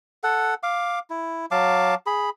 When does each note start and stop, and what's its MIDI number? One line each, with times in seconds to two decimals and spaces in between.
0.24 0.54 69
0.24 0.54 78
0.63 0.99 77
0.63 0.99 86
1.10 1.46 64
1.51 1.95 54
1.51 1.95 77
1.51 1.95 81
1.51 1.95 86
2.06 2.30 68
2.06 2.30 83